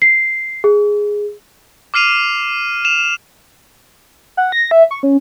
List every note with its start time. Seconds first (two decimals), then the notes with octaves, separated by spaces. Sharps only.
0.02 C7
0.64 G#4
1.94 D6 F6 C7 D#7 F7
2.85 E7 F7
4.37 F#5
4.52 A#6
4.71 E5
4.91 C#6
5.03 C#4